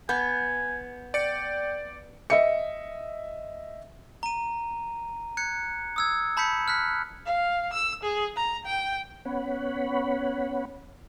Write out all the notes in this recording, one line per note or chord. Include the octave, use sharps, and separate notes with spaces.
B3 G#5 G6
D5 G5 C#7
D#5 E5 C#7
A#5 D#7
F#6 G#6 C#7
D#6 E6 G#6
A5 B5 G6 B6 C#7
F6 F#6 B6
F5
E6
G#4
A#5
G5
B3 C#4 C#5 F#5 B5